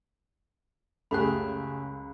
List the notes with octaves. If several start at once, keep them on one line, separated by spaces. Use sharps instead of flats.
C#2 F#2 A3 G4 G#4 B5 F#6